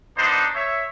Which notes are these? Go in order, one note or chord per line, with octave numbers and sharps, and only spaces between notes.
B3 D4 D#4 C5
C#5 E5